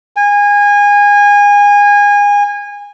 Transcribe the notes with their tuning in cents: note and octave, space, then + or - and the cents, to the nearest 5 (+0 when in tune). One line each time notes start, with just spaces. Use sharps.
G#5 -25